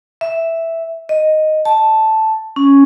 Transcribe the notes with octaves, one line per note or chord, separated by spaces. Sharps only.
E5
D#5
A5
C#4